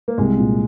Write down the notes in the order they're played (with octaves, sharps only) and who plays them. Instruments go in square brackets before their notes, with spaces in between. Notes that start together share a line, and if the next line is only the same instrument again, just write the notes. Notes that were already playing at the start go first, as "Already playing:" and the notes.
[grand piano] A#3
[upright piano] C2 [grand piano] G#3
[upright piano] A#2